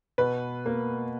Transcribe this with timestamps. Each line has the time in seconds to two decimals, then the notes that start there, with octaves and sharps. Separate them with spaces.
0.18 B2 B4
0.66 A#3